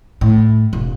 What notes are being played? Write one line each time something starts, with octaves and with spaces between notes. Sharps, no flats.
A2
E1